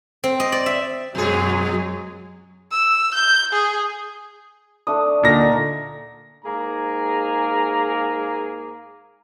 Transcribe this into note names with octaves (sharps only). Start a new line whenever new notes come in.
C4
D#5
D5
E5
F#2 B2 F#3 G#3 G#4
E6
G6
G#4
A3 D4 D#6
A#2 D3 D#4 A#6
G#2 A#3 G#4 A#5